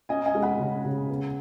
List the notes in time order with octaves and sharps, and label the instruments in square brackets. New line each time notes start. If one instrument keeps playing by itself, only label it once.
[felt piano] C#4 D#5 G#5
D#5 G#5
G#3
F#5 B5
C#3
C#3
B3